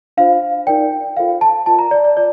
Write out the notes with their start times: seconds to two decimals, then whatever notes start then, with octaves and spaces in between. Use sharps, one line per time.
0.17 D4 F4 C5 F5
0.67 D#4 A#4 D5 G5
1.17 F4 A4 C5 F5
1.41 A5
1.66 F4 A#4 D5 A5
1.79 A#5
1.91 D5
2.04 D5
2.17 F4 D5